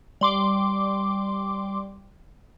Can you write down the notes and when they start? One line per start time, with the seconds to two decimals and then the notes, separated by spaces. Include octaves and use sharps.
0.21 G3 C6 D6